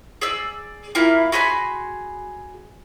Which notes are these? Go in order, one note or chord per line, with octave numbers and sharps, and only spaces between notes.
G#4 D5 E6
A#3 E4 F4
F#4 G#4 B5 C6